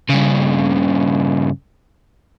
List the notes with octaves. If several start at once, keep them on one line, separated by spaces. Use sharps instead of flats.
G2 C#3